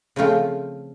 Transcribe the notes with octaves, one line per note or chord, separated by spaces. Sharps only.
C#3 F3 A3 C4 F4